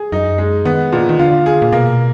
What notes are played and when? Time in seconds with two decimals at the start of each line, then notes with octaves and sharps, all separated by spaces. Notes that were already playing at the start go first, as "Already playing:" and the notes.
Already playing: G#4
0.12 F#2 D#4
0.38 G#3
0.65 D#3 B3
0.92 A#2
1.09 D#3
1.19 D3 F4
1.46 G#4
1.62 A#2
1.72 B2 A#3